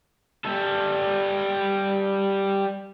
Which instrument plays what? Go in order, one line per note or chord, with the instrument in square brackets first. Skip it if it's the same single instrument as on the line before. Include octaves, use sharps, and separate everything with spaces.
[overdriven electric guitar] G3 A4